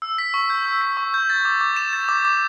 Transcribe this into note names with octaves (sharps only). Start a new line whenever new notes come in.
E6
B6
C#6
G6
E6
B6
C#6
G6
A6
D6
D6
E7
A6
D6
D6